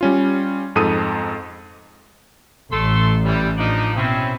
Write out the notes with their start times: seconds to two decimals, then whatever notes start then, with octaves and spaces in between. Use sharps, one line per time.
0.01 G3 C#4 F4
0.76 F2 G#2 A4 D#6 D#7
2.71 A1 A3 A4 C6
3.25 E3 G3
3.58 F3 D4 D#4
3.96 B2 C4 C#4 E4